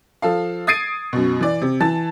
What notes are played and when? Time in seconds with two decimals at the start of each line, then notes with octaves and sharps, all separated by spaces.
0.22 F3 A4 F5
0.67 D#6 G#6 A6 C7 D7 D#7
1.13 F#2 B2
1.41 E3 D5
1.62 C3
1.80 E3 A5 A6